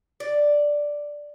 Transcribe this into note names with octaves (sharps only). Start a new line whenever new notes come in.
D5